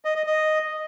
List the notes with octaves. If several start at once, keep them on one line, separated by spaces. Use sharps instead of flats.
D#5
D#5
D#5